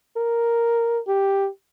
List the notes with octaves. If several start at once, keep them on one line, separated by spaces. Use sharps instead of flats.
A#4
G4